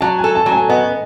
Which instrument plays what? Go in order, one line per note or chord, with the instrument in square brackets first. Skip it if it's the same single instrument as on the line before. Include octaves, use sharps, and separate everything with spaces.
[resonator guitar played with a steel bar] F#3 [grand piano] A5
[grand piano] G#5
[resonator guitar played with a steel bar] A4
[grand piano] A5
[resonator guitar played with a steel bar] F#3
[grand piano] G#5
[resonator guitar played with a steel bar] B3 [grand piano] D#5